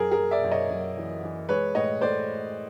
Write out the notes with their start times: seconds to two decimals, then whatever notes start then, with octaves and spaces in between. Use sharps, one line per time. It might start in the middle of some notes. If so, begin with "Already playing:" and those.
Already playing: F#2 G#4 A#4
0.11 G#4 A#4
0.19 F#2
0.31 D5 E5
0.44 F#2
0.51 C#5 D#5
0.70 F#2
0.97 E3
1.23 E3
1.49 G#3 B4 C#5
1.75 A2 C#5 D#5
2.01 A2 C5 D5